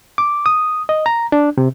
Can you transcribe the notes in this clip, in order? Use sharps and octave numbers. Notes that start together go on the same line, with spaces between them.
D6
D#6
D#5
A#5
D4
C3